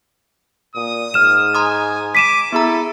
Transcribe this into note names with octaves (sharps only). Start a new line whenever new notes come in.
A#2 D#6
G#2 F6 E7
G#5 A#5 C6 D#6
D6 B6 D#7 E7
B3 E4 G#4 A4 A#5